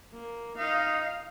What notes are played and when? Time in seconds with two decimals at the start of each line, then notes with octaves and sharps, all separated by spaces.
0.12 A#3
0.58 D#4 D#5 F5